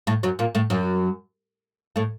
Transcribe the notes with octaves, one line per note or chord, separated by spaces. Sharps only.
A2 A3
F#2 F#3
A#2 A#3
A2 A3
F#2 F#3
A2 A3